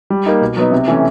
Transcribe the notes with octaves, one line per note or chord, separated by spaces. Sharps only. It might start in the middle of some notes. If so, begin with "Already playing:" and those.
G3
A#3 D#4
B2
F#3 B3 D#4
C3
E3 A3 C#4